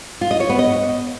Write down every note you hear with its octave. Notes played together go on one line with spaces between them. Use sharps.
F4
D#5
C#5
B3
D#5